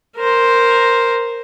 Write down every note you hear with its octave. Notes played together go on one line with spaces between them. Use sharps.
A#4 C5